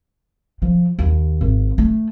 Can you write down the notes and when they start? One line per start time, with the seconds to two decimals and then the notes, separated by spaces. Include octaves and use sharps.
0.62 F3
0.99 D#2
1.41 G#1
1.78 A3